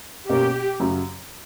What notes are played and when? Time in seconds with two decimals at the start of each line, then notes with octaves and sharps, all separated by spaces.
0.29 B2 A#3 C#4 G4
0.80 F#2 C#3 F#3